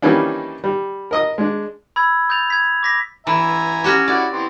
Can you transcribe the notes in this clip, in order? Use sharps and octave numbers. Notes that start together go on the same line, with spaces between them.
D#3 E3 G3 A#3 C#4 D4
G3
A#4 D#5 D#6
G#3 D4
B5 E6 G#6
D#6 G6 A6 F7
G#6 B6
D6 A#6 B6
E3 E5 G#5 A#5
C#4 F#4 G4
E4 F#4 D5
E3 B3 C4